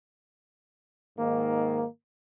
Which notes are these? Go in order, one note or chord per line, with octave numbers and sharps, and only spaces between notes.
G#2 D#3 A#3